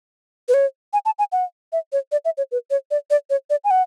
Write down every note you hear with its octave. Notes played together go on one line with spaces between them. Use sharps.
B4
C#5
G#5
A5
G#5
F#5
E5
C#5
D5
E5
C#5
B4
C#5
D5
D5
C#5
D5
G#5
F#5